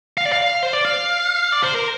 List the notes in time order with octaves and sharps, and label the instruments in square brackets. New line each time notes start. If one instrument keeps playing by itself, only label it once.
[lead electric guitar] F5
D5
F5
C5
D5
F5
D5
C5
A#4